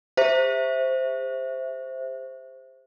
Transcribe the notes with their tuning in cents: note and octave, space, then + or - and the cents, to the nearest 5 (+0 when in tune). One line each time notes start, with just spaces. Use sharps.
G4 +45 C5 +0 E5 +0